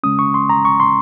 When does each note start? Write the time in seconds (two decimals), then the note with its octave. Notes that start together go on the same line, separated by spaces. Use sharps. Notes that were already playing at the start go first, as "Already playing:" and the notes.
0.03 C#3 G#3 C#4 D#6
0.19 C#6
0.34 C6
0.49 A#5
0.65 C#6
0.80 C6